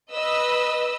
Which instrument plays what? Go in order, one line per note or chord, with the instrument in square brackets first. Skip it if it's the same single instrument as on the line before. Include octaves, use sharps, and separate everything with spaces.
[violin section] B4 D#5 E6